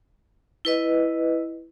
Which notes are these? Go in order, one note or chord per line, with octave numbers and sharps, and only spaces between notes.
E4 B4 D#5